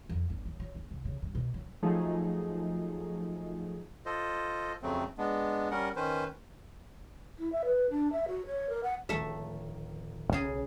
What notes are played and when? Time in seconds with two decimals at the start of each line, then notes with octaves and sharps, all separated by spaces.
0.09 F2
0.30 G1
0.46 F#3
0.60 F#3
0.75 G1
0.91 C2
1.05 C#3
1.22 G2
1.35 B2
1.54 F#3
1.83 F3 F#3 A3 D#4 G#4
4.06 F4 A4 C5 D#5
4.82 F2 C#3 F#3 A3 C4
5.18 G#3 B3 D4
5.71 G3 C#4 A#4 F#5
5.96 D#3 C#4 B4 C5
7.38 E4
7.52 E5
7.65 B4
7.90 D4
8.12 E5
8.28 F#4
8.46 C#5
8.69 A#4
8.83 F#5
9.09 D1 D#3 F3 A3 E5
10.33 B1 C#3 G#4